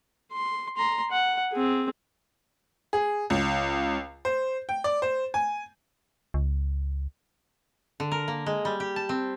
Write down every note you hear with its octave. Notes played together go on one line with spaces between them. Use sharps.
C6
A#5 C6
F#5
C4 G#4
G#4
C#2
C5
G5
D5
C5
G#5
C#2
D3
A#4
A#3
G#3
G3
G4
A5
C4